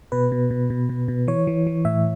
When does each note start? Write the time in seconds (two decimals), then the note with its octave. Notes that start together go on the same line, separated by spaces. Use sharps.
0.12 B2 B4
0.32 B2
0.51 B2
0.70 B2
0.89 B2
1.08 B2
1.28 E3 C#5
1.47 E3
1.67 E3
1.85 A2 E5